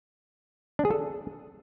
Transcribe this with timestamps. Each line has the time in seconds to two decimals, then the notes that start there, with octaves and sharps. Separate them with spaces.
0.79 D4
0.85 G#4
0.91 A4